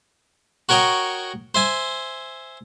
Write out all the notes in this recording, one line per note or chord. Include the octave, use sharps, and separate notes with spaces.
F#4 A#4 C#5 G5 A#5 D#6
C5 E5 G#5